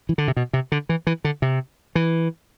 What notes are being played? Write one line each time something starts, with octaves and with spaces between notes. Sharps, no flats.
E3
D3
C3
B2
C3
D3
E3
E3
D3
C3
E3